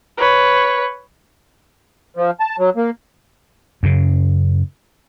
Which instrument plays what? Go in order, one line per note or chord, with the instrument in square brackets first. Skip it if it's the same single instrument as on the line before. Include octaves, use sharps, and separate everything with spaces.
[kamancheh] B4 C#5
[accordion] F3
A5
F#3
A#3
[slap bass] F#2 C#3